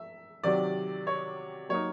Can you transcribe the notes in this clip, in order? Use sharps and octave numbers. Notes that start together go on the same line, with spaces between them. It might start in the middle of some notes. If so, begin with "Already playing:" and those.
Already playing: E5
C3 D#3 F#3 D5
C#5
F#3 A#3 D#4 C#5